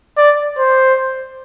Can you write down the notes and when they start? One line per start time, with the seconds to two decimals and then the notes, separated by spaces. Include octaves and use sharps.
0.18 D5
0.58 C5